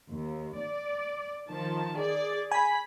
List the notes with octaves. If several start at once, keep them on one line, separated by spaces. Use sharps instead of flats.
D#2
D5
D#3 F3 A5
G#4 D5
G#5 B5 B6